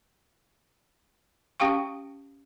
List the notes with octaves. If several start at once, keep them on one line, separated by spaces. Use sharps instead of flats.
C#4 G4 F5 G5 C#6